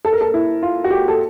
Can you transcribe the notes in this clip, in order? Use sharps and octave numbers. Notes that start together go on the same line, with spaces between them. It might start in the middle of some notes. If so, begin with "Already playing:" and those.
A4
A#4
A4
E4
F4
F#4
G4
A4